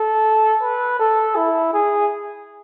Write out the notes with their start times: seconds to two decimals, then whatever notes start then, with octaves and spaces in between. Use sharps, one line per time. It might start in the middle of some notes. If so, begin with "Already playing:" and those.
Already playing: A4
0.63 B4
0.99 A4
1.36 E4
1.74 G#4